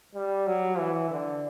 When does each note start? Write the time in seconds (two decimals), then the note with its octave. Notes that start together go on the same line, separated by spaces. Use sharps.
0.15 G3
0.47 F#3
0.79 E3
1.11 D3